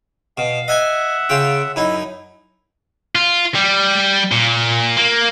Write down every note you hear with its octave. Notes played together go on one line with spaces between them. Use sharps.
B2 F5
D#5 E5 F#5 G#5
C#3 F4 G5
F#2 D#4 E4
F4
G3
A#2
A#3